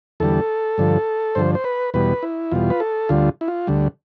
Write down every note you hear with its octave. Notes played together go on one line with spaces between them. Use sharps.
E2 D3 G3 A4
G2 D3 F3
G2 D3 F3 C5
C5
B4
E2 B2 G3 B4
E4
E2 B2 G3 F4
B4
A4
D2 D3 G3 F4
E4
F4
D2 D3 G3